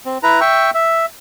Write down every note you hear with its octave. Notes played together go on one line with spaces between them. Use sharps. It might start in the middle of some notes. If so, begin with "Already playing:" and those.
C4
E4 B4 A#5
E5 G5 C#6
E5